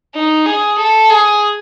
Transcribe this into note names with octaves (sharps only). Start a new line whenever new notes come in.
D#4
G#4
A4
G#4